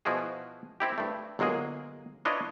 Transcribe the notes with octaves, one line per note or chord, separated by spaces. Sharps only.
B2 F3 E4 F#4 G#4
C4 E4 G4
G2 A3
G1 F#3 G#3 A#3 G#4
D4 E4 F4 B4 C#5 D#5